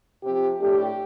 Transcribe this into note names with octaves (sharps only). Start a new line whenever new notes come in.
C3 F3 C4 G4
A2 A3 D4 G4